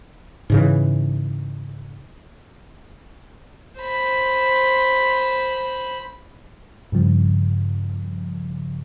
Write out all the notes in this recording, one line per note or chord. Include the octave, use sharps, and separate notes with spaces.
G#2 C#3 E3
C5 B5
G2 C#3 F3